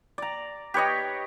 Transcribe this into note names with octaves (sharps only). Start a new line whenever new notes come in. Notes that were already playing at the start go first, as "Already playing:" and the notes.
D5 A#5
G4 B4 C#5 D#5